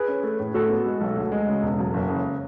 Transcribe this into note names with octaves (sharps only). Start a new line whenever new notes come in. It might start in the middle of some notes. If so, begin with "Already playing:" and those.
Already playing: G#4 B4
C#4
A3
A2
A2 F#4 A4
B3
G#3
B1
D2
G#3
C#3
E1
F#2
F#1
C#3